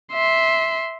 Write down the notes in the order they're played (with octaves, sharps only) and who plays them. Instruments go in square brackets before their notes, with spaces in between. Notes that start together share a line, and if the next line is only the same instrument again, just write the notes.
[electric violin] E5 C6